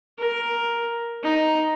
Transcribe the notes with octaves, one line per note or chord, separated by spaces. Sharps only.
A#4
D#4